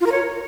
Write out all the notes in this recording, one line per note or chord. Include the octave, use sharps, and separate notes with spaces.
F4
A#4
C#5